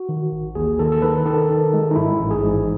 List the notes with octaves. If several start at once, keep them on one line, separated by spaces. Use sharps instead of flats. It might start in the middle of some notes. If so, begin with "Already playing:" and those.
Already playing: F#4
D#3
A1
D#2 G#4
D#3 A4
A4
D#3 B4
D#3 A4
D#3
G#3
D#4
G#2 E4
A1
G#4
G#2